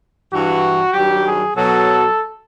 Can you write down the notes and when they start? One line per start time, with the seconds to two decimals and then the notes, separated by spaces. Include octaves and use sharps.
0.31 G2 E3 F#4
0.93 G2 D#3 F#3 G4
1.25 G#4
1.55 B2 F#3 A4